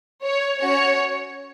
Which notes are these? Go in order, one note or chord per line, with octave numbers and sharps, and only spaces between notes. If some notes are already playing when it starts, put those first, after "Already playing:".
C#5
C#4 F#4 C#5